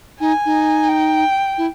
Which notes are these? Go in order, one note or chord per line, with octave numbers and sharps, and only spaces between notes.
D#4 G#5
D#4
G5
E4